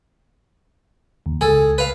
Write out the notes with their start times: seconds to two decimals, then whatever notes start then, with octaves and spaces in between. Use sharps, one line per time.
1.26 D#2
1.41 C#2 G#4 A4 G#5
1.78 B4 F5